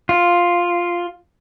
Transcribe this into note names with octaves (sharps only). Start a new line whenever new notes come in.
F4